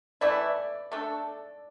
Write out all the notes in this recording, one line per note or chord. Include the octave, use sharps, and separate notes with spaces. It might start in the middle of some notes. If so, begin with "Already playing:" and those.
E3 A3 E4 D5
A3 D4 A4